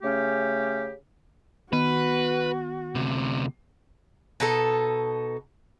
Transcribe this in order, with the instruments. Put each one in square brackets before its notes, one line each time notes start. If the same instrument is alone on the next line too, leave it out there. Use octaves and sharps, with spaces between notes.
[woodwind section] C#3 A3 C#4 G4
[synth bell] D#3 B3 [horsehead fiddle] F#4 [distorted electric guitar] B4
[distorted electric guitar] D2 C3
[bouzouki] B2 D#4 A4